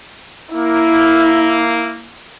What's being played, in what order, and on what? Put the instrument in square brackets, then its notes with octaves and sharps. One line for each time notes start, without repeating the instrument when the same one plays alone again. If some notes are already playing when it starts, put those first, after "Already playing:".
[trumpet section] A#3 [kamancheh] E4